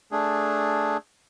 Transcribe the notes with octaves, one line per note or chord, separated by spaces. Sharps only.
A3 D4 G#4